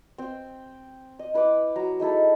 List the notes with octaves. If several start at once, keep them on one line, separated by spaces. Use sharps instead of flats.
C4 G5
D#5
E4 B4 B5 D6
F#3 A#5
G#3 D#4 E4 A4